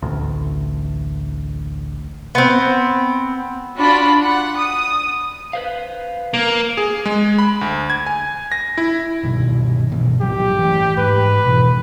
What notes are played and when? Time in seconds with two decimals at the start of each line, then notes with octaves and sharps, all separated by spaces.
0.02 A1 D2
2.35 B3 C4
3.78 D4 F4 F#4 B5
4.24 F#5
4.58 D#6
5.53 B4 C5 F5
6.34 A#3
6.77 G#4
7.06 G#3
7.39 B5
7.61 D2
7.90 G#6
8.06 G#5
8.52 A#6
8.78 E4
9.23 G2 B2 D#3
9.90 A#1 B2 E3
10.21 A#1 G2 F#3 G4
10.59 E3 A3
10.97 G#2 B4
11.45 B2 E3